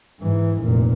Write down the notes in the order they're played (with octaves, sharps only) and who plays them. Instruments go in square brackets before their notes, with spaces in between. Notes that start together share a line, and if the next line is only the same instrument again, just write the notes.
[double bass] G#2 E3
F1 A#2